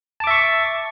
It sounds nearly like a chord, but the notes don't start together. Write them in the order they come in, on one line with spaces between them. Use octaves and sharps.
A5 D6 E5 C#6